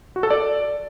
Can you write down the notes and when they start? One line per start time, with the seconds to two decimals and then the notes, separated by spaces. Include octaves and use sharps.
0.16 F#4
0.23 A4
0.30 D5